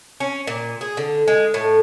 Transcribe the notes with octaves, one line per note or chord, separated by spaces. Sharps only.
C#4
A#2
G#4
D3
G#3
A2